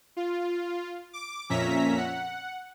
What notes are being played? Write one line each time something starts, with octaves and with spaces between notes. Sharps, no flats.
F4
D6
F2 A#2 C#4 E5 A#5 B6
F#5